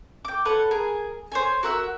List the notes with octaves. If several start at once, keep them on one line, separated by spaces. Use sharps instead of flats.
G5 D6
A4 B4 C#5 F#5
G#4 A#4
C5 C#5 G#5
F#4 A#4 E5 F#5